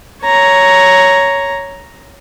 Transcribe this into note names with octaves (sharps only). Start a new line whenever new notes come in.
C#5 A#5